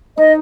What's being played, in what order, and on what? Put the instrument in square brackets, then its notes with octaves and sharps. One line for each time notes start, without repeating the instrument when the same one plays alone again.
[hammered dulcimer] D#4 [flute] D#5